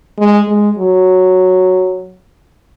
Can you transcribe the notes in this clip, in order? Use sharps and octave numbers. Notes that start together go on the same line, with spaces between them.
G#3
G#3
F#3